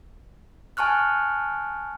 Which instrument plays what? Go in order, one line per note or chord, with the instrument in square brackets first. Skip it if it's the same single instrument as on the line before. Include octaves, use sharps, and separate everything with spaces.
[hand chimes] G#5 A5 C#6 F6 F#6